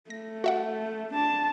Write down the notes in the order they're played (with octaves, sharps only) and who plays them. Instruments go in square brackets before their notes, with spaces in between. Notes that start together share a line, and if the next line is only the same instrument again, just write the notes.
[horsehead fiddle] A3 [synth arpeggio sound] A#6
[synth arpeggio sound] F#4 E5 F#5
[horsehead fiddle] D4 A5